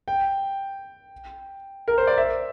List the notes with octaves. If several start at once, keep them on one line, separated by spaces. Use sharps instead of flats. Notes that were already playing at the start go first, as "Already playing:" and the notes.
G5
A#4
C5
D5
E5